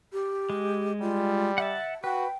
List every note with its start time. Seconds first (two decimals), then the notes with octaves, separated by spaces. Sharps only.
0.13 G4
0.50 G#3
1.02 G3 F4
1.58 E5 F#5 A5
2.04 F#4 B4 G5